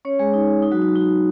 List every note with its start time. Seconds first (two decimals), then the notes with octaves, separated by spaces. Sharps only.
0.05 C#4 C#5
0.19 G#3 G#4
0.34 D#4
0.63 D#4
0.72 F#3 F#4
0.82 D#4
0.89 F#4
0.95 D#4